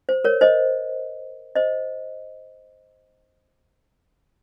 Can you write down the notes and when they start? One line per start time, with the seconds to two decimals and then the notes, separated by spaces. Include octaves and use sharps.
0.09 C5
0.24 A#4 C#5
0.41 C5 D#5
1.55 C5 D#5